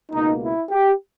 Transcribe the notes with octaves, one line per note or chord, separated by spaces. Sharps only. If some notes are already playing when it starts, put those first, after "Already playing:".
C#2 B2 A#3 D#4
E4
G4